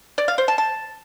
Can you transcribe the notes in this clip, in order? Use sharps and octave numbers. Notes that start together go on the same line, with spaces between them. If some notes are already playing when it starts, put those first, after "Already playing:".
D5
F5
C5
A5
A5